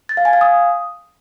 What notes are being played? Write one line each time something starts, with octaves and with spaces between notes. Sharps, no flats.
A6
F5
G#5
F5
D#6